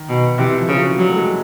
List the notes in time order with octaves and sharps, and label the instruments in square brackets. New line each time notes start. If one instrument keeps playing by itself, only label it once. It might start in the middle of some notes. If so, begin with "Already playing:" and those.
Already playing: [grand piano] D#3
[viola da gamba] B2
[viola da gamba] C3 [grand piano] E3
[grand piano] F3
[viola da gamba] C#3
[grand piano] F#3
[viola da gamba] F#3 [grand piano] G3
[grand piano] A3
G#3